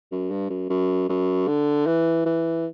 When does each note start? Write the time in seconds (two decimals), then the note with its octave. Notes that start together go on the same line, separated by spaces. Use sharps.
0.12 F#2
0.30 G2
0.50 F#2
0.69 F#2
1.09 F#2
1.48 D3
1.86 E3
2.26 E3